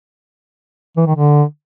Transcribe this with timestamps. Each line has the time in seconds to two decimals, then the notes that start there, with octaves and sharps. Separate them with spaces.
0.97 E3
1.06 D#3
1.15 D3